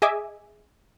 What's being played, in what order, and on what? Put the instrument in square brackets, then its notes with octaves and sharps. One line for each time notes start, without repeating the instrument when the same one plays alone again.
[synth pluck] G#4 D#5 E5 G#5 D6